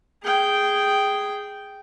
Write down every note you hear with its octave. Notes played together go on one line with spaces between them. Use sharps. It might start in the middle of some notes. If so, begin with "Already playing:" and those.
G#4 G5